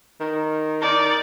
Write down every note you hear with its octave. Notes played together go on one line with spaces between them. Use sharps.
D#3
D#4 A#4 D5